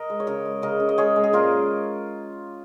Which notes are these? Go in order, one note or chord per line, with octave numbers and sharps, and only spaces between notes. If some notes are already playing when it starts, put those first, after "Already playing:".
Already playing: A#4 D#5
G#3
C#5
C#3 A#4 D#5
G#3
C#3 A#4 D#5
C#3
D#5
G#3 G#4 C#5
G#3
G#4
A#2 F4 A#4